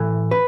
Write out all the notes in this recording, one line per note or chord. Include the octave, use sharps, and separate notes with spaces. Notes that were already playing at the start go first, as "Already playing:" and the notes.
Already playing: A2 E3
B4